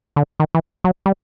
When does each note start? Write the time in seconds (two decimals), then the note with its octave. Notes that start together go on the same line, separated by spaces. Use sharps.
0.16 D3
0.40 D#3
0.55 E3
0.84 F#3
1.06 G3